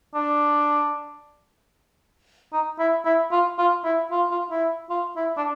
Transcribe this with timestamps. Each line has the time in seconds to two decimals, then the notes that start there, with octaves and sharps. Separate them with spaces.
0.15 D4
2.53 D#4
2.79 E4
3.05 E4
3.31 F4
3.59 F4
3.84 E4
4.12 F4
4.31 F4
4.51 E4
4.90 F4
5.16 E4
5.37 D4